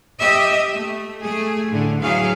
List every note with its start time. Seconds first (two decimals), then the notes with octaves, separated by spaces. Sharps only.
0.20 G4 D#5 E5
0.73 A3
1.24 A3 G#4
1.71 A2 D3
2.02 E3 F#3 G#4 F5